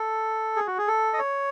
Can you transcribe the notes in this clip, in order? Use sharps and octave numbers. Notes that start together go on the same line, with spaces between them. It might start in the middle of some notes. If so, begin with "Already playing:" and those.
Already playing: A4
G#4
F#4
G#4
A4
D#5
C#5